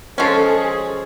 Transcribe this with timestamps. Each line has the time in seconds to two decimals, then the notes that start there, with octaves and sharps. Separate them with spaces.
0.18 F3 G#3 C#4 A4
0.46 G#4